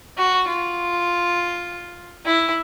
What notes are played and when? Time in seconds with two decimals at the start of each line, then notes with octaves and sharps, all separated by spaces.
0.18 F#4
0.48 F4
2.25 E4